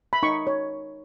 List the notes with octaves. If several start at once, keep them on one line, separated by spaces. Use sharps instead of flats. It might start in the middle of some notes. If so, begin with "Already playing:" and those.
B5
D#4 C#6
C#5